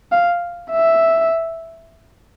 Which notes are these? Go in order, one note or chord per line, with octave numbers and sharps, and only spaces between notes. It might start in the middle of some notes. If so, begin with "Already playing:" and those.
F5
E5